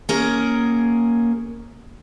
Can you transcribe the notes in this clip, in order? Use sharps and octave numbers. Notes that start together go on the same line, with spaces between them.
A#3 C#4 G#4 A#4